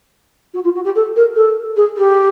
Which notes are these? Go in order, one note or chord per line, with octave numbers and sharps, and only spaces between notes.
F#4
F4
F#4
G4
A4
A#4
A4
G#4
G4